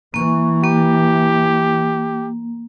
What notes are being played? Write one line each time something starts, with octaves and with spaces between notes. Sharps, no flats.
E3 A#3 C#6
A#3 G4